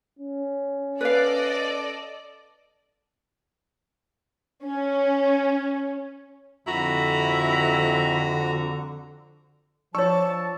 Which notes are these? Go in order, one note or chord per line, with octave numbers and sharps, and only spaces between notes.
C#4
A4 B4 D5 D#5 F5
C#4
F2 D3 E4 F#4 A#5
F3 D4 C#5 D5 A5 C#6 E6